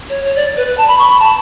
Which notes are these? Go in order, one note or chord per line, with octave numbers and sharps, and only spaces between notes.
C#5
C#5
D5
B4
B4
A5
B5
C#6
B5
A5